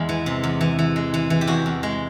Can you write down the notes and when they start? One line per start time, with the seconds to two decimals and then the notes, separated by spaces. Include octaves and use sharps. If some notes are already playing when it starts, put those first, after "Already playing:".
Already playing: E2 G#3 E4
0.09 E3
0.26 C3
0.43 E2
0.61 E3
0.79 E3
0.96 G#3
1.14 E3
1.30 E3
1.41 G4
1.47 E2 F#4
1.66 E2
1.83 G#3